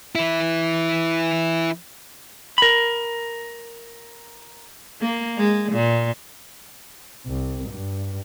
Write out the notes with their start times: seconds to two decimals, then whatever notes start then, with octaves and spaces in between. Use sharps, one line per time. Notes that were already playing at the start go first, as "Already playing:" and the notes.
0.15 E3 E4
2.58 A#4 B5
5.01 A#3
5.38 G#3
5.73 A#2
7.27 C2
7.69 G2